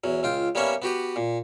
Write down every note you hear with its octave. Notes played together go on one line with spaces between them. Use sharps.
E2 F#3
C#2 F4 G5
G3 A#3 B3 C#4 C#5 E5
B3 F#4 G4 B4
A#2